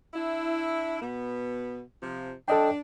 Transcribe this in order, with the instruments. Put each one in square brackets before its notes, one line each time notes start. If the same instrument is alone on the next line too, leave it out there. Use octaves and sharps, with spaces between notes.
[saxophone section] D4 E4
B2 B3
C3 F3
[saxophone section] D4 [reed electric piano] A4 D#5 G5